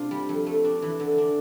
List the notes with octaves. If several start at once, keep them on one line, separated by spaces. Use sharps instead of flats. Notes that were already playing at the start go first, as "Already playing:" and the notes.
Already playing: C3 D4 F4
G3
F2
A3
D4
E3
D3
D4